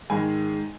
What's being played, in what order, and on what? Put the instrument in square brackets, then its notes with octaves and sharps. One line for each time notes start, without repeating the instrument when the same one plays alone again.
[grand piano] G#2 D#3 G#3 G#5